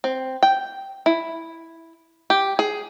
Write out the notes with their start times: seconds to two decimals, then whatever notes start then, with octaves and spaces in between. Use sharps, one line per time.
0.04 C4
0.43 G5
1.06 E4
2.30 G4
2.59 G#4